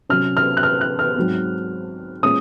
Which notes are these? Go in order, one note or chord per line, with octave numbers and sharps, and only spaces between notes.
C3 F#3 C#4 F6
F6
F#6
F6
F#6
F6
G#2 F#3 C4
A#2 G#3 C#4 D#6